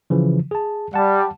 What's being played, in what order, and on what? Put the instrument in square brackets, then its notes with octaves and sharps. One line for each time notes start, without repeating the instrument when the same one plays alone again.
[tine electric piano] C#3 E3 F3
G#4 A5
[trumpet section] G3 [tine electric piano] F#5 A5